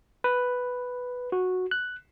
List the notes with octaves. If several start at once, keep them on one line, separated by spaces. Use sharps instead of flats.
B4
F#4
F#6